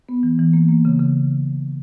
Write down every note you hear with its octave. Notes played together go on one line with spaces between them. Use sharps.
B3
E3
E3
A#3
A#3
C#3
C#3